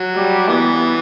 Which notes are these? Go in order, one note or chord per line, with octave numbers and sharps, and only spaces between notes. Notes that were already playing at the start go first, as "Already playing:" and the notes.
Already playing: F#3
G3
E3 B3